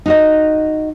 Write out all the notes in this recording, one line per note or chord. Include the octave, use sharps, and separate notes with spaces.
D#4 F#4 D#5